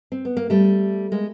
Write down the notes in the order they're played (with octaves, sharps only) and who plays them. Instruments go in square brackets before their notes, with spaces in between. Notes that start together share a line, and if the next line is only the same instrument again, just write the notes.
[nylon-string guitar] C4
B3
A#3
G3 A3
G#3 A#3